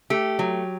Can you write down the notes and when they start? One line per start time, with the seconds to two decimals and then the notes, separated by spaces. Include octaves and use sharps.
0.10 A3 G4
0.39 F#3